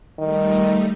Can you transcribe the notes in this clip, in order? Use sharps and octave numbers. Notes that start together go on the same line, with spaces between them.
D#3 G3 A3 D#4